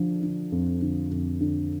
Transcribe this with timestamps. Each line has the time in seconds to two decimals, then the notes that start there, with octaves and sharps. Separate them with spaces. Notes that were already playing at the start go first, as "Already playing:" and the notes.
Already playing: D3 F3
0.23 D3
0.52 F2
0.81 D3
1.11 F2
1.41 D3